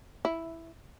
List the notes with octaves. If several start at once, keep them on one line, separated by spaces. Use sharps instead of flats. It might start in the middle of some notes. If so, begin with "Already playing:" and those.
E4